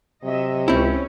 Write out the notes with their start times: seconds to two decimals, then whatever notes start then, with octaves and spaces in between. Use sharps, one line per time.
0.23 C3 F#3 D#5 E5
0.68 C#2 C4 C#4 E4